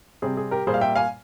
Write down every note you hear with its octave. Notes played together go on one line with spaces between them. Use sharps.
C3 G3 C4 G#4
G#4
G4 A#4
A#2 G3 A#3 G#4 C5
F5
E5 G5
F5 G#5